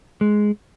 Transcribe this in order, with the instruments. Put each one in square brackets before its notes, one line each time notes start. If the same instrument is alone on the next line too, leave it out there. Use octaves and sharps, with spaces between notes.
[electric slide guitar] G#3